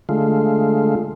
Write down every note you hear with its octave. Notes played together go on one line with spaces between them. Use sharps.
D3 G#3 A3 F4